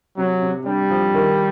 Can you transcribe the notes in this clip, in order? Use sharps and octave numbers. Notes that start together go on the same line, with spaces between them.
C3 F#3
C3
G3 D4
F3
D#3